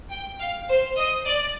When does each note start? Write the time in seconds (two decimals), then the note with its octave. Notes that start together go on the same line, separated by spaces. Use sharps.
0.10 G5
0.40 F5
0.69 C5
0.98 D#5
1.26 D5